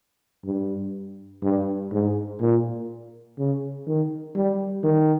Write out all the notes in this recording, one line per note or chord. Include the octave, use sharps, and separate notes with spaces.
G2
G2
G#2
A#2
C#3
D#3
G3
D#3